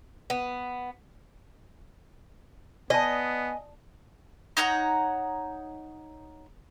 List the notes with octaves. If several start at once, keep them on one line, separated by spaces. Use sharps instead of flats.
B3
B3 D5 D#5 G#5 A5
D#4 C#5 F#5 A#5